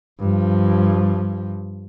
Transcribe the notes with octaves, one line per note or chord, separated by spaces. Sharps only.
G2 F3